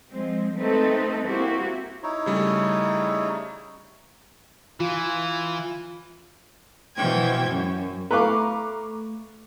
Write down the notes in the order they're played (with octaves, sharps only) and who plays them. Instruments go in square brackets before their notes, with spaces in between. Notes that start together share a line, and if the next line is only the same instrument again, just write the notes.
[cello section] F3 G#3 C4
A3 C4 D#4 A4 B4
A#3 C4 E4 F#4 G4
[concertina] D#4 E4 C#5
[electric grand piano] C#3 G3 A3
[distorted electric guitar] E3 [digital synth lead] F4
[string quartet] B2 E3 F3 G5 G#6
F#2
[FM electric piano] A3 [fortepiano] B4 F5 [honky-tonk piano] A#5 C#6 D6